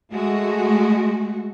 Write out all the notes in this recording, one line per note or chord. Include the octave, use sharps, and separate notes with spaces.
G#3 A3 F#4